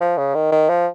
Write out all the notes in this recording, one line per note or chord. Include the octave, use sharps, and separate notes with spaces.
F3
C#3
D#3
D#3
F3